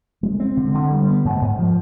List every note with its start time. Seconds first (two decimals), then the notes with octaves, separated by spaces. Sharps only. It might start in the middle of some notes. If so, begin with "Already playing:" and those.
0.23 G#3
0.40 C4
0.57 D3
0.74 D3
0.91 G3
1.08 B3
1.25 G#2
1.41 G#2
1.59 F3